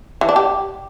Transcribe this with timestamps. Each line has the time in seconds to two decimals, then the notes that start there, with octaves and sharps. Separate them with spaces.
0.21 E3
0.29 D4
0.36 G4